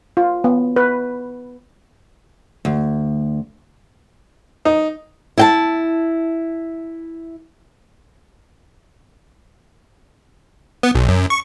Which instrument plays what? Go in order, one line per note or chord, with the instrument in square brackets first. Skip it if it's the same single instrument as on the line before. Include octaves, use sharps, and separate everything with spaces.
[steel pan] F4
B3
B4
[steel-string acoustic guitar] D2
[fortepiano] D#4
[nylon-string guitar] E4 G5 A5
[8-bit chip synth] B3
B1
F#2
C#6